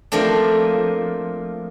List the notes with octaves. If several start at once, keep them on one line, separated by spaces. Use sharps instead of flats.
F3 A3 A#3 C4 D4